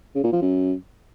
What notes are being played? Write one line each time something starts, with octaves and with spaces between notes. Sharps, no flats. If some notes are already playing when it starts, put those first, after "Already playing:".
C#3
A#2
F3
F#2